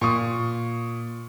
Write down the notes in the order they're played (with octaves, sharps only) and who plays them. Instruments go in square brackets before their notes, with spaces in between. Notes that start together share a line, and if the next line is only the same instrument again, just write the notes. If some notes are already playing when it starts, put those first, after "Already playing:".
[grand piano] A#2 C#6 D#6